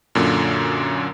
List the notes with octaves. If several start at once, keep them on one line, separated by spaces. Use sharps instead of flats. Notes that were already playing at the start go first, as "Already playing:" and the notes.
F#2 A#2 D3